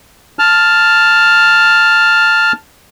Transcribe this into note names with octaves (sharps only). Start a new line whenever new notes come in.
A5 F6